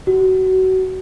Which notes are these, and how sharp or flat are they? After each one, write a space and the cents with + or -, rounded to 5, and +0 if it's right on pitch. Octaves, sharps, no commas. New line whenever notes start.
F#4 +25